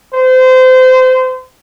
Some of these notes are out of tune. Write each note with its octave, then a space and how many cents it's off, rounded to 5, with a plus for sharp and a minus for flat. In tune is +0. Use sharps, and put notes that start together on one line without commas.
C5 -25